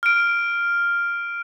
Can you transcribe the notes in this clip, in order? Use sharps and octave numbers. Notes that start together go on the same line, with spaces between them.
F6 D7